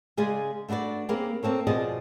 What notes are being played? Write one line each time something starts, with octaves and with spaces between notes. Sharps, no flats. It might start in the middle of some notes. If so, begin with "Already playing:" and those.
C#3 G#3 G#4 D5 G#5
A3 D4 F#4 B4 D5
A#3 C4 C#4 G4 G#4 B4
A#3 C4 A4 C#5
B2 F3 G#4 D5 D#5